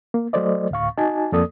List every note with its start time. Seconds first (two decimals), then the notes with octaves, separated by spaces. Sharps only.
0.14 A#3
0.33 F#3 A3 A4 C5 D5 D#5
0.71 D2 A2 F5 C#6
0.98 D#4 F#4 D#5 G#5 A5
1.32 F2 A#3 A4 D5 D#6